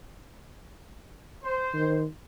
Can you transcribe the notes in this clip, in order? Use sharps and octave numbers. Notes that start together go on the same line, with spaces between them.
C5
D#3